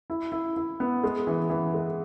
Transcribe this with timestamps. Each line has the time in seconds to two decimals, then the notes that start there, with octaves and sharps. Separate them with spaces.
0.10 E4
0.32 E4
0.56 E4
0.80 B3
1.04 G#3
1.27 E3
1.50 E3
1.74 G#3